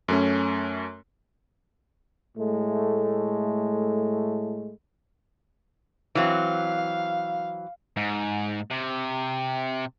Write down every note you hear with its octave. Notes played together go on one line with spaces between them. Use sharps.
F#2 A3 C#4
A2 G#3 A3
E3 F#3 C4 F5
G#2
C3